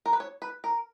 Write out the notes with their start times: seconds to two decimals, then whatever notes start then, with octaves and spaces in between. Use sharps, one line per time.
0.06 A#4
0.13 B4
0.20 C#5
0.42 B4
0.64 A#4